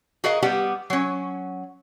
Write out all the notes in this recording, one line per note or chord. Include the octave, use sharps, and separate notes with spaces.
F#4 G#4 A#4 D#5 F5
G3 B3 G4 F#5
F#3 C#4